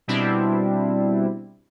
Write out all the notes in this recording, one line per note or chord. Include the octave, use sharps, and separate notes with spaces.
B2 G3 C4 D4 E4